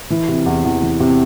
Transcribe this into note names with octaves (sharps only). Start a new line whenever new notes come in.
E3
C3
E2
E2
E3
C3